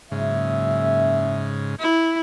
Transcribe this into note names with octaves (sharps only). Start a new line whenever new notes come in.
F#1 G#2 C#3 E5
E4